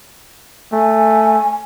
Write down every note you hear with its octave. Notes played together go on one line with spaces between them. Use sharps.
A3 G#5